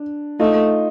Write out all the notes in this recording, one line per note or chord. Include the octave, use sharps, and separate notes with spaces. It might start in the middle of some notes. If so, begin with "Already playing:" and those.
Already playing: D4
A3 D#4 F4